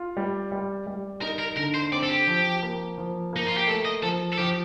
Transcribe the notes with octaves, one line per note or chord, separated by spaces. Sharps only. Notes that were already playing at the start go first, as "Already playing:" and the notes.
Already playing: F4
G3
G3
G3
D#4 A#4
A#4
D3 A#4
C5
C4 D5
A4
G4
F3
A#3
F3
A#3 D#4
F4
G4
A3 A4
D#5
F3 A4
A4
F3 G4